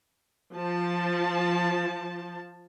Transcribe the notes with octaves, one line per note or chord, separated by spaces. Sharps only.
F3 A5